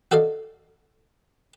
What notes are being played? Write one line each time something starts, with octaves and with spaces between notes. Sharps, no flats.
F#4 A4 D5 D#5 F5